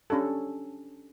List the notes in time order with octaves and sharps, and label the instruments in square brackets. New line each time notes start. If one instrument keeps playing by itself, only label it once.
[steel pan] C#4 D4 G4 A4